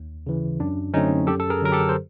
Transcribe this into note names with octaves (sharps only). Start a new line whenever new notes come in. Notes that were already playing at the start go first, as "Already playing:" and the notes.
Already playing: D#2
C#3 E3
F#2 D4
D3 F#3 A3 C4 C#4 D#4
F#2 G4 A4
A4
G#4 A#4
D3 F#3 A#4
G4 A4
C5